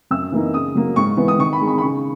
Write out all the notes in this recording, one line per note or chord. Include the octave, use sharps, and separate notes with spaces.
F#2 E6
E3 A#3 D#4
C#3 D#6
F#3 A#3
G#2 C#6
E3 B3
D#6
D#3 C#6
B5
G#3 D#4
B5
B5
C#3 C#6